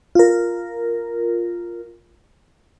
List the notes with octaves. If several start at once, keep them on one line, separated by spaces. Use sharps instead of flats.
F4 A#4